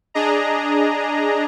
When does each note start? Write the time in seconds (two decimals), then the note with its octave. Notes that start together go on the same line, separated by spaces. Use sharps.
0.14 D4 G#4 D#5 A#5